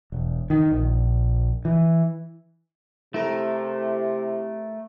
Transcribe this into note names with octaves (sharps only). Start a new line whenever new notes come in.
E1
D#3
A#1
E3
C3 A3 E4 A4 A#4